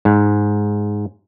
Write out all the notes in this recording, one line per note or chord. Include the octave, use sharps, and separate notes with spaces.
G#2